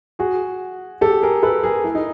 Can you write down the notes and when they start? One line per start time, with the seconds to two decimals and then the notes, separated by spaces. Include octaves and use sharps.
0.19 F#4 G#4
1.01 G4 A4
1.22 G#4 A#4
1.43 A4 B4
1.63 G#4 A#4
1.84 E4
1.95 D#4